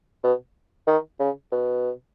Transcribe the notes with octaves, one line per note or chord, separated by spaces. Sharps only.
B2
D#3
C#3
B2